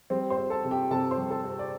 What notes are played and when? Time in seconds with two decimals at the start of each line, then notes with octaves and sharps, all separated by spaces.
0.10 G3 C4 C5
0.30 C5 C6
0.37 C4
0.50 A4 A5
0.65 C3
0.71 G4 G5
0.91 C3 A4 A5
1.11 C5 C6
1.18 G3
1.30 A4 A5
1.44 C4
1.59 D5